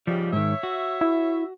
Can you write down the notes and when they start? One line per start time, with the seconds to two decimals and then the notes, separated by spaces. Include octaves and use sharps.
0.07 G#2 C#3 F3 G3
0.33 G#2 D#3 C#5 E5
0.63 F#4
1.01 E4